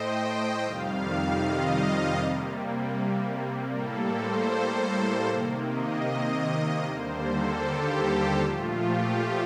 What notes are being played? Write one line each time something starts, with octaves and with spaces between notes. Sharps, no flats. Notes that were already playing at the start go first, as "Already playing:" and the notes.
Already playing: A2 A3 C5 D#5 G5
F2 C3 D#3 G3 F5
D#5
C3 G3 A#3
A2 G3 A#3 A4
C5
C3 D#3 A#3
D#5
D#2 D3 G3 A#3 C5
A4
G4
A#2 F3 A3 F4
G4